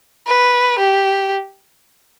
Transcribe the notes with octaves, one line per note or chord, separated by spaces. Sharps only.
B4
G4